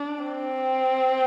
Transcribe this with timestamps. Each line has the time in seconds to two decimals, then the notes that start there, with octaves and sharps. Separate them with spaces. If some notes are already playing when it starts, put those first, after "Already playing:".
Already playing: D4
0.23 C4